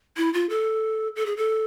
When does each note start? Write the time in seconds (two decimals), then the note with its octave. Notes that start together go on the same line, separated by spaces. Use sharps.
0.17 E4
0.34 F4
0.50 A4
1.16 A4
1.26 G#4
1.37 A4